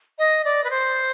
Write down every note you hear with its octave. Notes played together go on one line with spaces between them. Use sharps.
D#5
D5
B4
C5